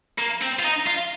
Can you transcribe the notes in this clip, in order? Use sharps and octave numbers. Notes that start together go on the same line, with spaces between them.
A#3
C4
F4
D#4
F4